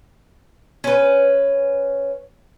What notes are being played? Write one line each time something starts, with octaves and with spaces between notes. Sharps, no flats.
C#4 B4